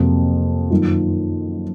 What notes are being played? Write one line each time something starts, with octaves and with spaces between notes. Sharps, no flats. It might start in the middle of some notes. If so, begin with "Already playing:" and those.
Already playing: F2 C3 F#3 A#3
F#2 D#3 A#3 F4